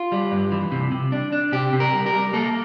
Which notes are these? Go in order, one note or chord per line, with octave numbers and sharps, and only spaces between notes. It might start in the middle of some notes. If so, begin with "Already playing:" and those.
Already playing: F4
G3
G2
E3
C3
C3
D4
D4
C3 G4
C3
A#4
G3
A#4
G3
A#3 A4